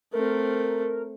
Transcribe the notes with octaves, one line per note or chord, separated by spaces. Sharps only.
A3 C4 A#4